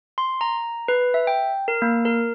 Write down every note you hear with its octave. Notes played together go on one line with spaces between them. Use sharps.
C6
A#5
B4
E5
G5
A#4
A#3
A#4